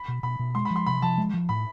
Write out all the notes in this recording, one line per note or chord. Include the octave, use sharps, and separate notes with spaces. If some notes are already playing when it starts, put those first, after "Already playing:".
Already playing: B5
B2
B2 B5
B2
G#3 C6
B5
F3
C6
C3 B5
F3 A5
G#3
F3
A2 B5